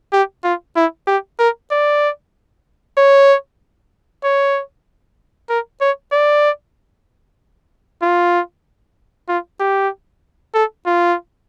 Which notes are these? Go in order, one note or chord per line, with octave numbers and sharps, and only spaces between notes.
G4
F4
E4
G4
A#4
D5
C#5
C#5
A#4
C#5
D5
F4
F4
G4
A4
F4